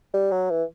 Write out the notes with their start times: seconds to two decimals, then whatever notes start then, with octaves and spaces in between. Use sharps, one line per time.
0.14 G3
0.31 F#3
0.50 E3